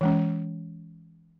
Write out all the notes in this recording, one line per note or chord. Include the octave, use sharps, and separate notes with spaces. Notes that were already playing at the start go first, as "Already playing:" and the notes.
E3 G#3 C#4